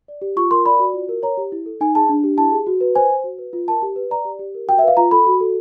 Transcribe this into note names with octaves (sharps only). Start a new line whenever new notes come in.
D5
G4
F4 C#6
A#4 C6
D5 B5
F#4
F4
A#4
C#5 A#5
G4
E4
A4
D#4 G#5
G#4 A5
D4
G4
E4 A5
G#4
F#4
B4
C5 G#5
C5
F#4
B4
F4
A#4 A5
G4
B4
D5 A#5
G4
G4
A#4
F#4 G5
E5
B4 F5
F4 A#5
A4 B5
F#4
A4